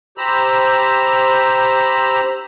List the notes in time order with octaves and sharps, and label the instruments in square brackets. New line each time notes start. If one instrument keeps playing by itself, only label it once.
[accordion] G4 C5 A#5 B5 E6